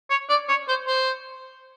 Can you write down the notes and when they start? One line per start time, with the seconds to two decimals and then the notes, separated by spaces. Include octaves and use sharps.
0.10 C#5
0.29 D5
0.49 C#5
0.68 C5
0.87 C5